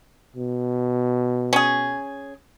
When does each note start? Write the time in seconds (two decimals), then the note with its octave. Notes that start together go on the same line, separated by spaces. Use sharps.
0.37 B2
1.53 C#4 G#4